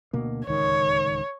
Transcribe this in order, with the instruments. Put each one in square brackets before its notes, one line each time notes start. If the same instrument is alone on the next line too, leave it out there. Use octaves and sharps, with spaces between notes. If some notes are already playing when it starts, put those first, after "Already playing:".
[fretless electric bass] D2 B2 A#3
[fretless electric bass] D1 C#2 D#3 [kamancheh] C#5